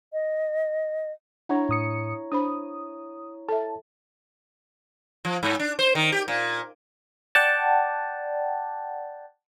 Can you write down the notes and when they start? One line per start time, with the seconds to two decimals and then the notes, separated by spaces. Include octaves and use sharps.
0.13 D#5
1.49 D4 E4 C#5 F#5 A#5
1.69 A2 D#6 C#7
2.32 D4 C5 B5 D#6
3.49 A4 E5 A5
5.25 F3
5.43 G#2
5.59 D4
5.79 C5
5.95 D#3
6.12 G4
6.28 A#2
7.35 D5 F#5 G5 A5